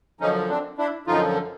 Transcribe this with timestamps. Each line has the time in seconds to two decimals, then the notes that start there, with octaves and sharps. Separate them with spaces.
0.21 F#2 D3 F3 C#4 D#4
0.50 C4 D4
0.78 D4 E4
1.07 F#2 D3 F3 D#4 F4